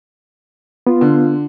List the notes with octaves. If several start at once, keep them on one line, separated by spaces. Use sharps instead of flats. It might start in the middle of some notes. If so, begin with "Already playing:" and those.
B3 F4
D3